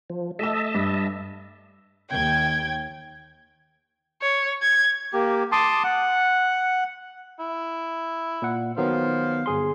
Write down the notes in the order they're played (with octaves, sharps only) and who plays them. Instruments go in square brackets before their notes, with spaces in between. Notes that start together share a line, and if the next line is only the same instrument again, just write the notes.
[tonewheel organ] F3
[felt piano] A3 E6 [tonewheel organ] D#5 E5 A5
[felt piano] G2
[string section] D#2 G5 G#6
[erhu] C#5
G#6
[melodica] A#3 G4
A5 C6 D6 D#6
F#5
[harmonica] E4
[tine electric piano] A#2 F#5
[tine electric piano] D#3 F#3 B3 [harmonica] C5 F5
[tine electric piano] G1 G#4 C6